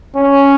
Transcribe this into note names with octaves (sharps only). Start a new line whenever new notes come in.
C#4